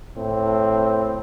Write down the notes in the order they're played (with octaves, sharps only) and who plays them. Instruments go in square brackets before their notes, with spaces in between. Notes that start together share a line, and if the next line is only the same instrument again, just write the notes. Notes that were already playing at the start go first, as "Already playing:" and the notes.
[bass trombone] A2 [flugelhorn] C4